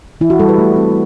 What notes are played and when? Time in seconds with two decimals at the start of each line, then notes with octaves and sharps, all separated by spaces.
0.21 E3 E4
0.30 F#4
0.40 G3 A4
0.49 B4
0.58 A3
0.76 C4